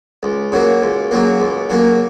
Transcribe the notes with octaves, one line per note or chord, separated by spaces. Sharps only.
C#2
C#3 F#3 A#3
C#2
C#3 F#3 A#3
C#2
C#3 F#3 A#3